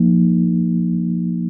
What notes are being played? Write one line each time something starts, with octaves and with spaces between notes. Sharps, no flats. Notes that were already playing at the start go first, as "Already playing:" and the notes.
Already playing: F3 A#3 D#4